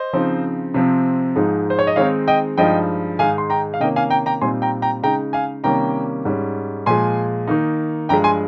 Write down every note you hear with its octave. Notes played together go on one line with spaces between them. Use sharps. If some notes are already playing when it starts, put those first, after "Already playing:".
Already playing: C5 D#5
C#3 F3 C4 D#4
C3 F3 C4
G#2 F3 G#3 D#4
C5
C#5
D#5
D#3 G#3 C4 D#4 C#5 F5
D#5 G5
G2 F3 G#3 D#4 D#5 G5
G#2 D#3 G#3 D#4 F5 G#5
C6
G5 A#5
F5
C3 D#3 A#3 C#4 D#5 G5
F5 G#5
G5 A#5
G5 A#5
A#2 G3 C4 D#4 G#5 C6
G5 A#5
G5 A#5
C#3 G#3 D#4 G5 A#5
F5 G#5
C3 D#3 G3 A#3 C#4 G5 A#5
G#2 G3 C#4
A#2 F3 G#3 G#5 C6
D#3 A#3 D#4
G2 F3 G#3 G5 A#5
G#5 C6